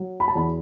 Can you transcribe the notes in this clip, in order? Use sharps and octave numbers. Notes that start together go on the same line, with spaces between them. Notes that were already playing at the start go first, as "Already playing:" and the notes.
Already playing: F#3
B5
A5
E2 B5